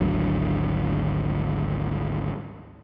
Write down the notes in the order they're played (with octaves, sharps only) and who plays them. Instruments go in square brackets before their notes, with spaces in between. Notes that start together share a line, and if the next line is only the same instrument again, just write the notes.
[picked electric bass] G#1 D2 D3 F#3